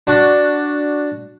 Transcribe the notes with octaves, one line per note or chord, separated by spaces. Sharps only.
D4 F#4